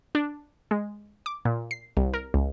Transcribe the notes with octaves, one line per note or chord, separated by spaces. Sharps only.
D4
G#3
D6
A#2
C7
C2
A#4
C#2